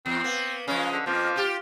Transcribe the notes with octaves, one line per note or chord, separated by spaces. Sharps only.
E2 C4
A#3 B3
C#3 F3 G#3 C#4
D3
F2 F3 A#3
F4 G4